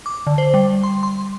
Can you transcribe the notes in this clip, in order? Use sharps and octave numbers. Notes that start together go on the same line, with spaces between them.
D6
D3
C5
G3
C6
C6